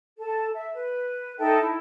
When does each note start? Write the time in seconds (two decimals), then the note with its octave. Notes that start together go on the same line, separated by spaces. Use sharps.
0.19 A4 A5
0.53 E5
0.73 B4
1.38 D#4 A4 E5 G5
1.61 E4